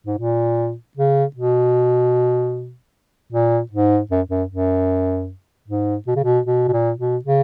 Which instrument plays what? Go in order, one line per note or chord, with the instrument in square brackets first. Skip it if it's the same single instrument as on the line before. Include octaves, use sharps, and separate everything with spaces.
[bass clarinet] G#2
A#2
C#3
B2
A#2
G#2
F#2
F#2
F#2
G#2
B2
C#3
B2
B2
B2
A#2
B2
C#3